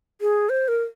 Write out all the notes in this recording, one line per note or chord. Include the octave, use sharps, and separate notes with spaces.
G#4
C5
A#4